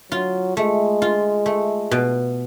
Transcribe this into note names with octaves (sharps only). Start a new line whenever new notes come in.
F#3 F4
G#3 A3
F4
A3
B2